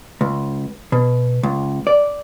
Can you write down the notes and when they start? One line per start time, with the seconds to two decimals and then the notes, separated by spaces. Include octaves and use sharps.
0.21 C#2
0.92 B2
1.43 C#2
1.87 D5